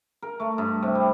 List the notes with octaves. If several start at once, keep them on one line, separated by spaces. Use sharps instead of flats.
A#4
A3
G2
C3
G3